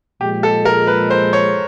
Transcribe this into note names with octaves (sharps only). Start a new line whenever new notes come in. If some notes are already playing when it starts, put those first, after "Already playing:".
A#2 F3 G#3 G4
A4
A#4
B4
C5
C#5